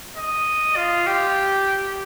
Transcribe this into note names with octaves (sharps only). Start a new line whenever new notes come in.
D#5
F4
G4